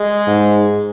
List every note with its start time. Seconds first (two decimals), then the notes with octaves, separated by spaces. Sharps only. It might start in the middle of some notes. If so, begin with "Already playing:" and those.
Already playing: G#3
0.27 G#2